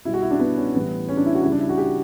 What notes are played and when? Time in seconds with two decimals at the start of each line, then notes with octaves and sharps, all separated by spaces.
0.05 B2 G3 E4
0.14 F#4
0.22 E4
0.31 D4
0.40 B3
0.57 C#4
0.74 A2 E3 G3 B3
1.08 C#4
1.17 D4
1.26 E4
1.35 F#4
1.43 C#3 G3 E4
1.52 D4
1.60 E4
1.69 F#4
1.78 G4